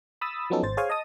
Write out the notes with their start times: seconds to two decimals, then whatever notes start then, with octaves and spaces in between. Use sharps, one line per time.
0.21 B5 D#6 E6 A6
0.50 F3 F#3 B3 C#4 D#4 A4
0.63 G#1 C5 A6
0.77 G#4 C5 C#5 F5 G#5
0.90 D#5 A5 D#6